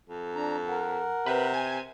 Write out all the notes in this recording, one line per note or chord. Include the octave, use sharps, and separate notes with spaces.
F2
D4 A#5
A#4 F#5
C3 B4
G#5